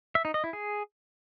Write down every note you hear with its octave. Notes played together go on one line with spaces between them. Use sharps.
E5
D#4
D#5
E4
G#4